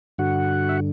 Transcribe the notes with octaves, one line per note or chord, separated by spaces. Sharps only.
G2 D3 F#4 F#5
E5